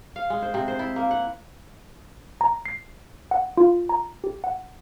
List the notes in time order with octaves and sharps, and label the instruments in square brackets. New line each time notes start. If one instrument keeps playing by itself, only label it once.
[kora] F5
G#3
C5
C3
C5
E4
A#3
F#5
[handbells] A#5
C7
F#5
F4
A#5
G4
F#5